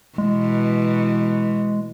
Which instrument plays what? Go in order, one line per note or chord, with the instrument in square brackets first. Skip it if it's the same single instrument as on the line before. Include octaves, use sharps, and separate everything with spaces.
[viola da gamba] B2 E3 [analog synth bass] G#3